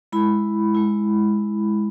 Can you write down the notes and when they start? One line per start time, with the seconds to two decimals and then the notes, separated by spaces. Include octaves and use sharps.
0.12 G#3 E4 B5
0.75 G#3 E4